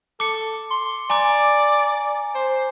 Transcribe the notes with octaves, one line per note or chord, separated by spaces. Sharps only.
A4 D6 C#7
C6
D5 G#5 A#5 D6
C5